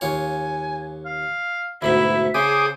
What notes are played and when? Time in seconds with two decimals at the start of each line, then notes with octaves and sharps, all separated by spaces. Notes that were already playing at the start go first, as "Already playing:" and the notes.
0.01 D#2 F4 C#5 G#5
1.05 F5
1.82 D2 G#2 B2 E4 E5
2.34 C#3 G#4 C5 D6 D#6